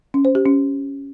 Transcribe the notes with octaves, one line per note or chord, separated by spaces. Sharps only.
C#4
C5
G4
C#4